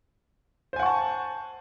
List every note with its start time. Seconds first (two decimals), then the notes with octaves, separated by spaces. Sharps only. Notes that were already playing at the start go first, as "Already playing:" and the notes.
0.73 C5
0.76 G#5
0.79 F#5
0.83 C#6
0.86 A5